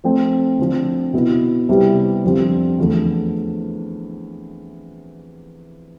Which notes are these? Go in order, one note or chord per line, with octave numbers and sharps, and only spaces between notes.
F3 A3 C4
D3 F3 C4
B2 B3 E4 B4
C3 G3 B3 E4 B4
F2 D3 G3 C4 F4
E2 D3 F3 A3